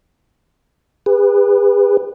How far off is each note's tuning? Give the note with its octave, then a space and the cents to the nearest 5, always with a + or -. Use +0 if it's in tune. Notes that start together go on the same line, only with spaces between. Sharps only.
G#4 -45 B4 +0